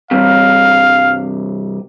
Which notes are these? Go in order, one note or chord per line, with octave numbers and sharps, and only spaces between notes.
C2 G2 C3 F5